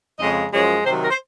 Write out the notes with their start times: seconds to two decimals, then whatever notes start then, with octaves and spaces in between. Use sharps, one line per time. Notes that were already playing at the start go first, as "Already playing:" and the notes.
0.20 F2 C#3 G#3 D#5
0.52 F#2 F3 G#3 C#5
0.85 C3 D#3 F#3 C5
1.02 A#4
1.11 C5